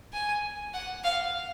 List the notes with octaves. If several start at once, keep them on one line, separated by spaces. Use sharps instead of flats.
G#5
F#5
F5